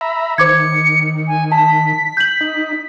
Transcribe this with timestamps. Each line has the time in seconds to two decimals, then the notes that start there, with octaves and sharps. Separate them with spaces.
0.01 E5 A#5 B5
0.38 D#3 C5 D6 G#6 C#7
1.27 G#5
1.52 A5 B6
2.17 G6 F#7
2.41 D#4